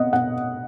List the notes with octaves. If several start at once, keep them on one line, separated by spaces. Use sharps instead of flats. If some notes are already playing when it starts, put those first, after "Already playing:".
Already playing: B3 D#5 F#5
B3 F#5